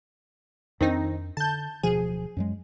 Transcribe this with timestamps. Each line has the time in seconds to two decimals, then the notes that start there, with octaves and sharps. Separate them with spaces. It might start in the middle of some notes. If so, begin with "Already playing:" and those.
0.81 F2 D#3 C4 D4 D#4
1.37 D3 A5 G6
1.83 D1 B2 F3 G#4
2.37 F#2 F#3 G#3